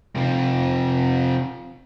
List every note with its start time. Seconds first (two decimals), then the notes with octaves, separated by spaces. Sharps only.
0.16 C3 F3